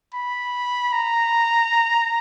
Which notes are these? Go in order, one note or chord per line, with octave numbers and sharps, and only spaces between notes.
B5
A#5